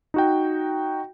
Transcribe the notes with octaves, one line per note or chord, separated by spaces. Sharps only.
D#4 F#4 G5